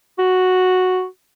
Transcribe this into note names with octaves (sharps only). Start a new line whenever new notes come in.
F#4